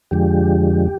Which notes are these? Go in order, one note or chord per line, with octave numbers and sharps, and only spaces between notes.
F2 D3 F3 G#3 G4